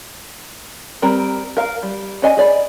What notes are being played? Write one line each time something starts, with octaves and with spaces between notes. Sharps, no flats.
G3 C4 A#4 G5 A#5
A#4 F5
G3
C#4 D5 D#5 G#5
G#4 D5 B5